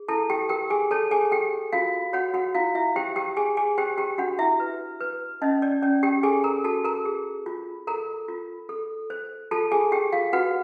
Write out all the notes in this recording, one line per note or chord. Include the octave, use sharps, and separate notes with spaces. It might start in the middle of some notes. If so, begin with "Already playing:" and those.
Already playing: G#4
E4 A4 A5
G4 G5
G4 A#4 G5
G#4 G#5
A4 C#5 A5
G#4 G#5
G4 A4 G5
F4 F#4 F5
F#4 C#5 F#5
F#4 F#5
E4 F4 F5
E4 E5
G4 C5 G5
G4 G5
G#4 G#5
G#4 G#5
G4 C5 G5
G4 G5
D4 F#4 F#5
E4 E5
B4
B4
C#4 D#4 D#5
D5
C#4 D5
G4 G5
G#4 A4 G#5
A#4 A#5
F#4 A4 A5
A#4 A#5
G#4
F4
A4 A#4 A#5
F4
A4
C5
F4 A4 A5
G#4 G#5
G4 G#4 G5
F4 F5
F#4 B4 F#5